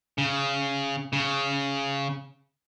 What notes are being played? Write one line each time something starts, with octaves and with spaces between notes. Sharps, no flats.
C#3
C#3